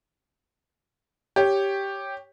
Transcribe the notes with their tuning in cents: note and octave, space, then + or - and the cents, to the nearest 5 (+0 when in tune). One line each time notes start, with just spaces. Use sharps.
G4 +0 C#5 +0